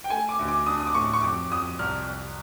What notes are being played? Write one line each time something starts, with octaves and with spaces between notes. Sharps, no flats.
G5
A3 G#5
D6
D2
D6
D4 D#6
D#6
D6
A2 C#6
C#6
F2 D6
F2 D#6
C2 F6
C2